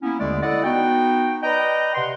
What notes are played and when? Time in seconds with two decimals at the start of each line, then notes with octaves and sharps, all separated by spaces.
0.02 A#3 B3 C#4 E4
0.19 D#2 D3 G#3 A3 D5
0.43 E4 A4 D5 D#5 F#5
0.64 B3 D#4 F#4 G5
1.43 B4 D5 D#5 G5 A#5
1.95 C3 F#5 C6